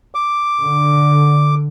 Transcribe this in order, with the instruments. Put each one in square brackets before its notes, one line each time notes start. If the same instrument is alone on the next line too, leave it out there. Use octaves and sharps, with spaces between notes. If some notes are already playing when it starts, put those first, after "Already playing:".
[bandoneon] D6
[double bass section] D3